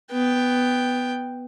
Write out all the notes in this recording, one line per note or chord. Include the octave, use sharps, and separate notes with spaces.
B3 G5